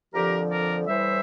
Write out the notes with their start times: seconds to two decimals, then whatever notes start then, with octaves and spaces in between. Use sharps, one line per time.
0.14 F2 D3 F3 G4 A#4
0.51 A#4 D5
0.87 A2 E3 G3 C5 E5